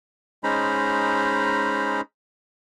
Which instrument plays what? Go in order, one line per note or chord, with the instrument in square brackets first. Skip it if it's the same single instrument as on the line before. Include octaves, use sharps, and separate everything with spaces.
[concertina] G#3 C#4 D#4 C5 A#5 B5